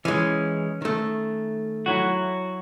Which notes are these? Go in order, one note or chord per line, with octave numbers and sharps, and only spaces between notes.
E3 G#3 C#4
D#3 A3
F#3 E4 F#4